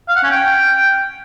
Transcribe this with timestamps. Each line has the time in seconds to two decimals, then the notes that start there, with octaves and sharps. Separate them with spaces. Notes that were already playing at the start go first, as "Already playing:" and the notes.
0.08 F5
0.16 F#5
0.23 C#4
0.31 G5